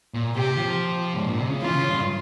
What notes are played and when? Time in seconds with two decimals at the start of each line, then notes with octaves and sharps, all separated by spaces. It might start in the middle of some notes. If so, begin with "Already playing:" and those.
0.14 A#2
0.36 C3 G4
0.57 F3
1.15 G#2
1.26 A#2
1.39 C3
1.50 C#3
1.62 E3 F4
1.76 C#3
1.90 G2